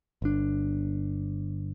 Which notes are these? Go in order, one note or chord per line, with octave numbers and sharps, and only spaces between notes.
G1 D4